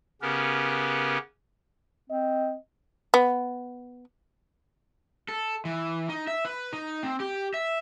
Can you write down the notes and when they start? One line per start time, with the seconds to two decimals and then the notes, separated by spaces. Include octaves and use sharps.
0.22 C#3 B3 C#4 G4 A#4 B4
2.10 C4 D#5
3.14 B3
5.28 A4
5.65 E3
6.09 D#4
6.27 E5
6.45 B4
6.73 D#4
7.03 C4
7.20 G4
7.54 E5